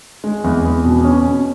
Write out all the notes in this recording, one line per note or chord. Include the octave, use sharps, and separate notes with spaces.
G#3
E2
E2
B2
C#4
B2